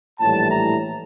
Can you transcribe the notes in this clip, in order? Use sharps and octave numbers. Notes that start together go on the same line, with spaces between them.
A#1 A2 E3 G3 A5
A#5